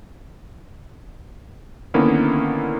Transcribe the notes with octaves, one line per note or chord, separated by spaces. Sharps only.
D3 D#3 A#3 B3 C#4 E4